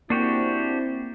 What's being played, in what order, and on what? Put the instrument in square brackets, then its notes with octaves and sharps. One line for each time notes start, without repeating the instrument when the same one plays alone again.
[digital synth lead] A#3 [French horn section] C4 E4 [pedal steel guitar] D4 F#4 G4